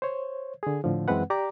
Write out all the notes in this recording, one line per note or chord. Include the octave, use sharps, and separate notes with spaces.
C5 C#5
D3 G#4
A2 D3 F3
F#2 E3 G#3 C4 B4 F#5
G4 D5 A#5 D6